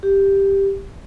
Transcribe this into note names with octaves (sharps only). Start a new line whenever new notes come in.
G4